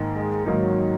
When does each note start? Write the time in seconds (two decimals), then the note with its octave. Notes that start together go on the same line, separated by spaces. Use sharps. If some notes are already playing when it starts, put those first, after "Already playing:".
Already playing: G#2 D#3 A#3 D#4
0.16 G#3
0.46 G#2 D#3 F#3 A#3 D#4